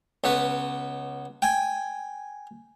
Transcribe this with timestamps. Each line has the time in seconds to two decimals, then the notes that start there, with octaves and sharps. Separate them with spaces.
0.24 C#2 B3 B4
1.42 G5 G#5